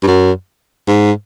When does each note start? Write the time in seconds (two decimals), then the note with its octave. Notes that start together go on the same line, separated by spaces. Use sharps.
0.03 G2
0.07 F#2
0.88 G#2